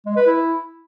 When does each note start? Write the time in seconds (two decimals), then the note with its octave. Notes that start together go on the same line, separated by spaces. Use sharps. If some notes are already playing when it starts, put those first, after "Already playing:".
0.06 G#3
0.16 B4
0.27 E4